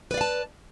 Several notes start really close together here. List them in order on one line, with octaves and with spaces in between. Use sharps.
B4 D5 F5 A5